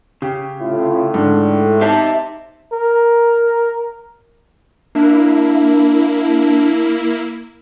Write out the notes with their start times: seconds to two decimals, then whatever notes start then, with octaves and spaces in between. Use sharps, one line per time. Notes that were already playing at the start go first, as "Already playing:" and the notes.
0.22 C#3 G4
0.60 A2 C#4 E4 F4
1.14 G#2 D3 D4
1.81 D#4 G4 C5 E5 A5
2.72 A#4
4.95 A#3 D4 E4